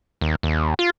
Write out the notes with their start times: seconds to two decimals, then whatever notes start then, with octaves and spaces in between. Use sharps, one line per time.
0.21 D#2
0.43 D#2
0.79 F4